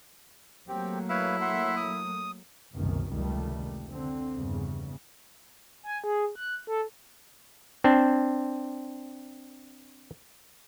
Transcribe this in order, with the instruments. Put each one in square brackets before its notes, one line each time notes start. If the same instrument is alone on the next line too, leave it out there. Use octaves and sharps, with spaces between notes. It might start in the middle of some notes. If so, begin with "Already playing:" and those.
[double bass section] F#3 A3 A#3 [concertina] C4 G4
[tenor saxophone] E4 [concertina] B4 C#5 F5
[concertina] E5 F#5 C6
D#6
[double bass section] F#1 C2 F#2 B2 D#3
F1 C#2 D#3 G3 A3
D3 C4
E2 G2 C#3
[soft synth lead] G#5
G#4
F#6
A4
[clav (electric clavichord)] C4 D4 C5